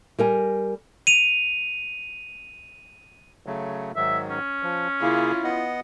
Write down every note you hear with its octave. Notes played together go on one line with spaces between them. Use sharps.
G3 A#4 G#5
D#7 F7
C#3 F#3 A3
G#2 D#3 F#3 E5
C#4
F3
C#3 A#3 E4 F4 G#4
B3 D#5 F#5